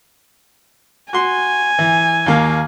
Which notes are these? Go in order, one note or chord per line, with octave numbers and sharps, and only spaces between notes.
F#4 G#5 C6
E3
D#2 A#3 F5